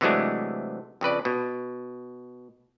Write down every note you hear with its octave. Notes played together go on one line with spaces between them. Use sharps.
C3 E3 F#3 G#3 A3 D4
F2 C#3 B4 D5
B2